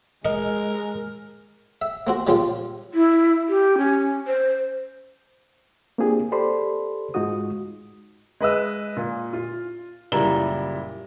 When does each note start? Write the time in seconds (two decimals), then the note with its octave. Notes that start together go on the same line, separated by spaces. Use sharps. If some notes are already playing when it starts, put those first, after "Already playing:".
0.25 G#3 A#4 D#5
1.82 E5
2.07 A#3 C4 F#4
2.27 A#2 C#3 G3 C4 D4 F4
2.94 E4
3.49 G4
3.78 C#4
4.27 C5
5.98 A#3 C4 D4 F4 G4 G#4
6.32 G4 A4 C5 D5 B5 C6
7.14 G#2 G#3 D#4 F4 F#4 D#6
8.40 G#3 B4 D#5 E6
8.97 A#2
9.33 F4
10.12 F#1 A#2 G3 E4 A#5 G7